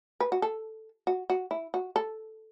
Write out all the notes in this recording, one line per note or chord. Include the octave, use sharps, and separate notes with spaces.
B4
F#4
A4
F#4
F#4
E4
F#4
A4